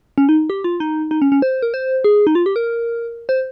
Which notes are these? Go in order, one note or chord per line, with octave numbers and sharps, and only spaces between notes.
C#4
D#4
G4
F4
D#4
D#4
C#4
C#4
C5
A#4
C5
G#4
D#4
F4
G4
A#4
C5